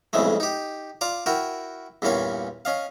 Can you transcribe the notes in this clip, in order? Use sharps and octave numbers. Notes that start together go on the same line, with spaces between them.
B1 F2 C#3 E3 G#3 A3
D#4 G4
F4 D5 A#5
E4 F#4 A#4 G5
E2 G2 A#2 A#3 C#4 C#5
C#4 D#5 F5